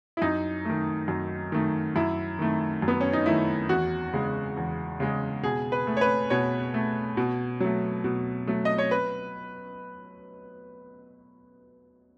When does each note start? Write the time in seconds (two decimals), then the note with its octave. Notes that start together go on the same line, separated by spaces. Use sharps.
0.17 E4
0.22 F#2 D#4
0.65 D#3 A3
1.08 F#2
1.52 D#3 A3
1.96 F#2 E4
2.39 D#3 A3
2.82 F#2
2.88 B3
3.00 C#4
3.13 D#4
3.26 D#3 A3 E4
3.69 E2 F#4
4.13 C#3 G#3
4.57 E2
5.00 C#3 G#3
5.43 B2 G#4
5.72 B4
5.87 A3
5.97 C#5
6.01 B4
6.30 B2 C#5
6.74 A3
7.17 B2
7.60 F#3 A3
8.04 B2
8.47 F#3 A3
8.65 D#5
8.78 C#5
8.91 B4